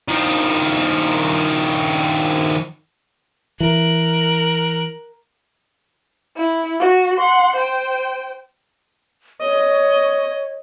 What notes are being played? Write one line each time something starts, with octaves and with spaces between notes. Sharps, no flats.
D#3 F3
E3 A#4 F#6
E4
F#4
F#5 C6
C5 G5
C#5 D#5